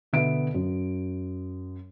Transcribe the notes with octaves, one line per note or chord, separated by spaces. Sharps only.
B2 D3 B3 E5 D7
F#2